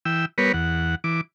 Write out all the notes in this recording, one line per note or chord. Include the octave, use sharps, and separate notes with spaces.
E3 G5 E6
G3 B3 A#4 B4 C#5
E2 F#5
E3 D6